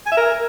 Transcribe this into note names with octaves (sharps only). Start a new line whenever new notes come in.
G#5
E5
A#4